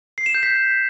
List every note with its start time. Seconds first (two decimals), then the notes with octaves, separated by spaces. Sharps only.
0.18 C7
0.26 E7
0.34 G6
0.43 B6